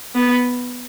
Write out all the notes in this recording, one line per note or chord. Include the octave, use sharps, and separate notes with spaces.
B3